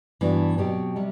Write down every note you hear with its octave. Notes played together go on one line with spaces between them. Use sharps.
G2 E3 B3 D4 F#4
B2 F#3 C4 G4
C3 G3